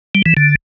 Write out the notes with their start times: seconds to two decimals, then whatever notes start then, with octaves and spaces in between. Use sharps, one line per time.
0.15 G3
0.26 E3
0.37 D3